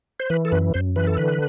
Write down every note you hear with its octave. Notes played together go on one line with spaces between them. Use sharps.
C5
E3 B4
A4
F#2 B4
F#2 C5
E3 B4
A4
D3 B4